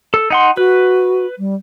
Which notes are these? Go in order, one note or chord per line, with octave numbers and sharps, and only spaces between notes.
A4
D#4 F#5 C6
F#4 B4
G3